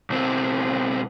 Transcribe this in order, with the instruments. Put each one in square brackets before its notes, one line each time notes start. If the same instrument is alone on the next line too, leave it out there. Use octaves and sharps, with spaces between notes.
[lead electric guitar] B1 C4